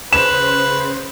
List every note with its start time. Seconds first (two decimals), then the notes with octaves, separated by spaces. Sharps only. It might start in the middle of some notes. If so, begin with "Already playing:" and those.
0.13 C#3 B4 C5 E7